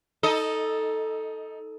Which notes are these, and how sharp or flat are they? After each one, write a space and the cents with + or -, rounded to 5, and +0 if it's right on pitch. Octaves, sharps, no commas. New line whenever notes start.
D#4 +20 A4 +0 D#5 +0